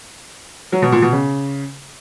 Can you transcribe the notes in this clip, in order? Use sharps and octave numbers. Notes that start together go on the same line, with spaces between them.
F#3
B2
A#2
B2
C#3